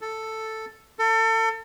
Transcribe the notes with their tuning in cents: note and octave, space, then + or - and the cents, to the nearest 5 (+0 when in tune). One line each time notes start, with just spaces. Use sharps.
A4 +5
A4 +35